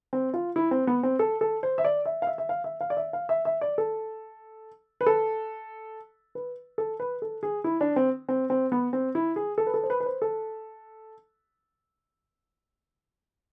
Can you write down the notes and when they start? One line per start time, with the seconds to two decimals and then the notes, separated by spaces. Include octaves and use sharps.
0.13 C4
0.34 F4
0.56 E4
0.71 C4
0.87 B3
1.03 C4
1.19 A4
1.41 A4
1.63 C5
1.78 E5
1.85 D5
2.06 E5
2.22 F5
2.27 E5
2.38 E5
2.49 F5
2.64 E5
2.81 F5
2.90 D5
2.97 E5
3.13 F5
3.29 E5
3.45 E5
3.61 D5
3.78 A4
5.01 B4
5.06 A4
6.35 B4
6.78 A4
7.00 B4
7.22 A4
7.43 G#4
7.64 E4
7.81 D4
7.96 C4
8.29 C4
8.50 C4
8.72 B3
8.93 C4
9.15 E4
9.36 G#4
9.58 A4
9.67 B4
9.74 A4
9.83 C5
9.90 B4
10.00 B4
10.06 C5
10.22 A4